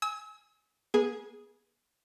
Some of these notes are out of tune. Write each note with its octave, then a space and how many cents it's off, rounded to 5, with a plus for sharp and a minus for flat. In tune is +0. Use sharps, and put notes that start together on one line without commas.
G#5 +0 E6 -40
B3 -35 G#4 +0